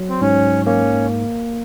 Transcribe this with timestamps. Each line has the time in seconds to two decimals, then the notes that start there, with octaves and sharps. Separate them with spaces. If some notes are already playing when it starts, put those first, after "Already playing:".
Already playing: F#3
0.09 C4
0.21 G#2 C#4
0.66 A#3 C#4